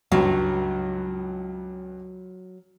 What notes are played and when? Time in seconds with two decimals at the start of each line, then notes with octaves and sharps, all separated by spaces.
0.12 C#2 G2 F#3